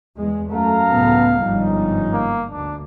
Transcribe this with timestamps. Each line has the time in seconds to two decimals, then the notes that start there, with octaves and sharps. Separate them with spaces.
0.19 E2 G#3
0.53 F#2 A3 A4 F5 A#5
0.90 C#2 A2 B3
1.42 G1 G#2 F3 G3 C#4 D#4
2.13 A#3
2.51 D2 D4